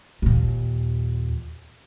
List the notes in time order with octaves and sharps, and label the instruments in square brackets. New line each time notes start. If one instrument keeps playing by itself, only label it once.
[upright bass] D#2 A#2